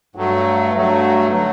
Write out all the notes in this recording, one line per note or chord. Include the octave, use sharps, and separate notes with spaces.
G2 F#3 A3
G2 F#3 A3
D3 F#3 A3